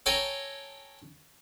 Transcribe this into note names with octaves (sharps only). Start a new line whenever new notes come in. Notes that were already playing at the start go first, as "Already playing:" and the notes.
A4 C#5 G5 G#5 A#5